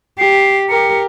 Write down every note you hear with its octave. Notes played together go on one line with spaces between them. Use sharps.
G4 C7
G4 A#4 C#7